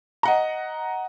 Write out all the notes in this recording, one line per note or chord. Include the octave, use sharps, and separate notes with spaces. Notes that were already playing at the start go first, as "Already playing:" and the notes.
D#5 F#5 A#5